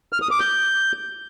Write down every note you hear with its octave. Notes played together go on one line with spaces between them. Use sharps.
F6
D#6
D6
G6